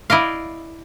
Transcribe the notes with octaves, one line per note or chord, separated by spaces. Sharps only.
E4 D5 D#5 F5